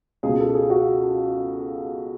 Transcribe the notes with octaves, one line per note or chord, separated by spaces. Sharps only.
C#2 B2 G#3 G#4
A4
G#4
F#4